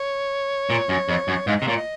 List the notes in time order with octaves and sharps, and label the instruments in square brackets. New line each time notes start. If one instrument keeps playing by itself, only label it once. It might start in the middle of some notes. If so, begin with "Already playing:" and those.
Already playing: [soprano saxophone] C#5
[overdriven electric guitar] A#2
F#2
F2
F#2
[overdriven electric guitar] G#2 [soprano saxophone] F5
[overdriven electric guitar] C3 [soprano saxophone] D#5
[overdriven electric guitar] A#2 [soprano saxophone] C#5
[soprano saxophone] D#5